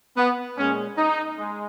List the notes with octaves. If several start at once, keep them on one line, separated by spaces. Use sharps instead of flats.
B3
A#2 G#3 C#4
D#4
G#3